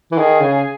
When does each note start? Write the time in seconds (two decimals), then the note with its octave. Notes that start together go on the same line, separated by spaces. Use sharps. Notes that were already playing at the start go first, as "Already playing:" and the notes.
0.12 E3
0.18 D#3 G#4
0.41 C#3